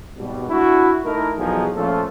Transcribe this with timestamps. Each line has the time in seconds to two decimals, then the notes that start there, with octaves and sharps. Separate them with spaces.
0.17 G#1 B2 G3
0.49 D4 E4 F#4
1.05 A3 D#4 E4 A#4
1.38 B1 E2 F3 F#3 D#4 G#4
1.75 A#2 F3 A3 C#4 F4 A4